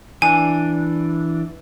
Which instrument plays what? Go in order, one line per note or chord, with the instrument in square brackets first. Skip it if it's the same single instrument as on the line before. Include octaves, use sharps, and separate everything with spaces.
[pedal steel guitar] E3 D4 [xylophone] G#5